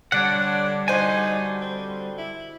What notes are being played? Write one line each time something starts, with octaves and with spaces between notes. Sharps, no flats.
D3 G3 D4 C#5 D5 F#5
D3 D#4 F#4 C5 G#5
C4
E4